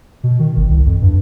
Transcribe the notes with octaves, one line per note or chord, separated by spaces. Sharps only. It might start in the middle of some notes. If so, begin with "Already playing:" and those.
B2
D#3
G#1
C2
F2
G2